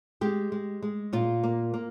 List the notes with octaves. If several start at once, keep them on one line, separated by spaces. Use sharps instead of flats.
G#3 G4
G#3
G#3
A#2 F4
A#3
A#3